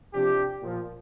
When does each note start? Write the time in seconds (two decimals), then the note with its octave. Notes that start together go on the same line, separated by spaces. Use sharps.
0.13 C3 F3 D4 G4
0.62 A#2 F3